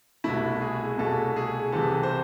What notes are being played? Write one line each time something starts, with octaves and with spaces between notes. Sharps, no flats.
C2 B2 A3 E4
G#4
C2 B2 A3 A4
G#4
C2 C3 E3 A4
C5